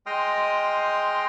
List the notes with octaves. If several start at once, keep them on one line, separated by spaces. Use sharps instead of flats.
G#3 D#5 G5 C6 D#6 F6